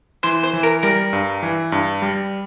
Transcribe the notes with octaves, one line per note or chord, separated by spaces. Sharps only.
E3 C5
C5
E3
A#4
G3 A#4
G2
E3
G2
G3